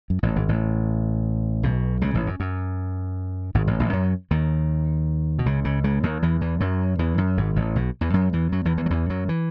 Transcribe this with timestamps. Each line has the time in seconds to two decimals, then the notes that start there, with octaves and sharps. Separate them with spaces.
0.10 F#2
0.23 A1 A2
0.36 G#1 G#2
0.49 A1 A2
1.63 B1 B2
2.01 C#2 C#3
2.14 A1 A2
2.27 F#2
2.40 F#2
3.55 G#1 G#2
3.67 A1 A2
3.80 A1 A2
3.93 F#2 F#3
4.31 D#2 D#3
5.39 B2
5.46 C#2 C#3
5.65 C#2 C#3
5.84 C#2 C#3
6.03 D#2 D#3
6.22 E2 E3
6.41 E2 E3
6.60 F#2 F#3
6.99 E2 E3
7.18 F#2
7.37 G#1 G#2
7.56 A1 A2
7.76 B1 B2
8.01 E2 E3
8.14 F#2 F#3
8.33 E2 E3
8.52 F#2 F#3
8.65 E2 E3
8.77 E2 E3
8.86 F#3
8.90 E2 E3
9.10 F#2 F#3
9.29 E3